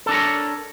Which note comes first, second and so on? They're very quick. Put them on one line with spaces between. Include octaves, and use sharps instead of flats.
A4 D4 A#4 C#5